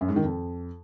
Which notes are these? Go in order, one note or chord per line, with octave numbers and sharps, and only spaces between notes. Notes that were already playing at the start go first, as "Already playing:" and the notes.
F#2
G#2
D#3
F2